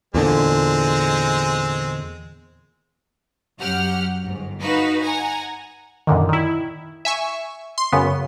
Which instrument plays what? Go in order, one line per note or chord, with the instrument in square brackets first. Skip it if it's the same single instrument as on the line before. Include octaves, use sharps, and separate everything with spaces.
[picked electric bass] E2 A#2 D3 [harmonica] G#3 C4
[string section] F#2 F#3 G4 F#5 F6
G1 G#2
D#4 F#4 B4 F5
F#5 G#5 A#5
[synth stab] F#2 A#2 D3 D#3
D#3 E4
E5 G#5 C#6
C6
F#2 C#3 B3